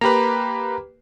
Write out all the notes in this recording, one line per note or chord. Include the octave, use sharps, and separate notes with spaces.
A#3 G4 B4 A#5 B5